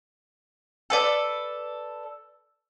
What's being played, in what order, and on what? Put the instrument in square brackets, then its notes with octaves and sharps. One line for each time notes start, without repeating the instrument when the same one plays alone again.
[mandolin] A4 B4 D5